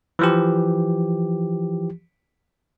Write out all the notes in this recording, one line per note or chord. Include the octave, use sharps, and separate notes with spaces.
E3 F3 G4